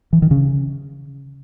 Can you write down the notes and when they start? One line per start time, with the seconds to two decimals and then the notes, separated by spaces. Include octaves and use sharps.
0.13 E3
0.22 D#3
0.31 C#3